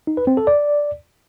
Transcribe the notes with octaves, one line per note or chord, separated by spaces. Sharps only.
D#4
B4
C4
A4
D5